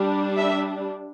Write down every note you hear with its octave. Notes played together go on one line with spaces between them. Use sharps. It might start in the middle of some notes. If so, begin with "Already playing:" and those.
Already playing: G3 D4
E5